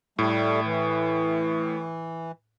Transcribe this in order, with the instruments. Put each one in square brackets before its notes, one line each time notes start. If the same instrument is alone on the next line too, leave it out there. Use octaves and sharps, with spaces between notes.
[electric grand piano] A2 [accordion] G3 A3
[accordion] E3